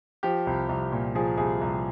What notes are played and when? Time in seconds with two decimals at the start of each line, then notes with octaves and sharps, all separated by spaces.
0.23 F3 G4
0.47 C2
0.69 C2
0.92 A#2
1.15 F3 G#4
1.37 C2 G#4
1.61 C2